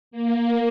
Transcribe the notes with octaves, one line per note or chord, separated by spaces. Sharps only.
A#3